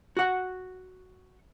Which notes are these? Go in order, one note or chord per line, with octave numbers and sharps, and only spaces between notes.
F#4 F#5